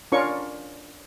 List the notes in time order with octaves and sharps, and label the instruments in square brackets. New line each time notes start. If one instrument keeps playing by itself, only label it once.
[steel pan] C#4 D4 F4 A#4 C#5 C#6